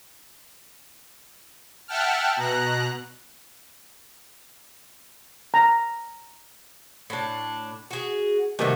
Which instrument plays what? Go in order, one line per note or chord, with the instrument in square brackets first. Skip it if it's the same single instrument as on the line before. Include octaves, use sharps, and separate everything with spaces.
[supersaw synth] E5 F#5 G5 A5 F6
B2 A#5 F#6
[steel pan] A#5
[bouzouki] A2 D4
F#4 G#4
[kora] G2 C3 D#3 [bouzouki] A3 F#4